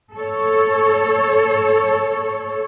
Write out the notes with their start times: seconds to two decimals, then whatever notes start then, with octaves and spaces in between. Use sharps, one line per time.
0.15 A4 C#5